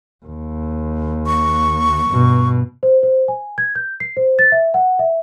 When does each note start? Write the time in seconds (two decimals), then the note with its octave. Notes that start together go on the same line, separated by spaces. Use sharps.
0.26 D#2
1.26 C#6
2.10 G2 B2
2.83 C5
3.03 C5
3.28 G#5
3.58 G#6
3.75 G6
4.00 C7
4.17 C5
4.39 A6
4.52 E5
4.74 F#5
4.99 E5